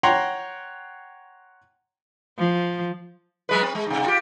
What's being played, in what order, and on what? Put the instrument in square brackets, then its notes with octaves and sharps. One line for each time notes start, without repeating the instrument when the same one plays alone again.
[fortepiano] C#5 F#5 G5 A#5 C6
[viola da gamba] F3
[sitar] F#3 G#3 B4
C4
G#3
G#2 C3
F4 G4